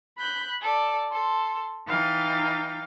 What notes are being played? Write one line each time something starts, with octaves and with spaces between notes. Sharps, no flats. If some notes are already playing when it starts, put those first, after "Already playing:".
B5 F#6 G6
A4 D5
A4 C6
E3 D#4 F5 G5 A6